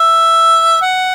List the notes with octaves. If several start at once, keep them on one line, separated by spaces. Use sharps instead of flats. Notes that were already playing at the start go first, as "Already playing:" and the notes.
Already playing: E5
F#5